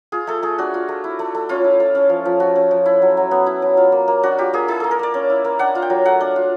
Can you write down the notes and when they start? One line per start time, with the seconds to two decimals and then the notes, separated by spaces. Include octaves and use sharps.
0.12 F4 G#4
0.27 A3 A4
0.43 A3 G#4
0.58 D4 F#4
0.74 F4
0.89 A3
1.04 E4
1.19 A3
1.35 A3
1.49 C#4 F4
1.64 E4
1.80 A3
1.95 C#4
2.10 F3
2.25 F3
2.40 A3 F#4
2.56 C#4
2.71 F3
2.86 E4
3.02 F#3
3.17 F#3
3.31 B3
3.46 E4
3.62 F#3
3.77 F4
3.92 A#3
4.08 A#3
4.23 D4 F#4
4.38 F4 G4
4.53 A#3 G#4
4.68 E4 G#4
4.80 A#3 A4
4.91 A#4
4.99 A#3 D5
5.14 C#4
5.30 E4
5.45 A#3
5.59 D4 F#5
5.75 F4
5.82 G5
5.90 F#3
6.05 A3 F#5
6.21 D4
6.36 F4